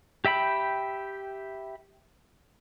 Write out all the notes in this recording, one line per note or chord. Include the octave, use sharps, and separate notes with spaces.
G4 E5 G5 B5